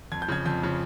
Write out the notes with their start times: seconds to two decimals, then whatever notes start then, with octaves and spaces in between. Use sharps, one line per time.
0.12 F2 G#6
0.22 G6
0.29 C#3 F3 G#6
0.46 F2 G6
0.63 C#3 F3